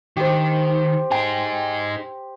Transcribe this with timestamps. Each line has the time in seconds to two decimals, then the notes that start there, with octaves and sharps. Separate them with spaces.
0.17 D#3 G4 C5
1.11 D#4 G#4 G5